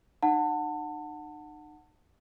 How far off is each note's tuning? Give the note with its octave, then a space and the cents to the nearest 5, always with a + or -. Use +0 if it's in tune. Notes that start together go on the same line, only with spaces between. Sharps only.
D#4 -35 F#5 -10 A5 +25